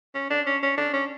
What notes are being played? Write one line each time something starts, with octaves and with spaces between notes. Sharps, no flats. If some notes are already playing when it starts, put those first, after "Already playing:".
C#4
D4
C#4
C#4
D4
C#4